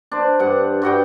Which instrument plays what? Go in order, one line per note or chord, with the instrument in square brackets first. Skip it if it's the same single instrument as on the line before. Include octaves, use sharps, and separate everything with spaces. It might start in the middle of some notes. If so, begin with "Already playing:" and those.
[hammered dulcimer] D4 C5
G2 F#5
G2 F#4 F#5 G5